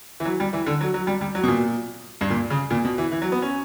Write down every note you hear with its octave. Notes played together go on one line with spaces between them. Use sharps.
E3
F#3
G3
E3
D3
F#3
F#3
G3
G3
F#3
B2
A#2
G2
A#2
C#3
A#2
B2
E3
E3
F#3
B3
C#4